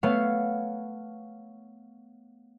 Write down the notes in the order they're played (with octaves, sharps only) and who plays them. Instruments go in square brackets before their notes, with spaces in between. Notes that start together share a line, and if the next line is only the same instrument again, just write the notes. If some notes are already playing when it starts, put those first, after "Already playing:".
[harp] A3 B3 C#5 F5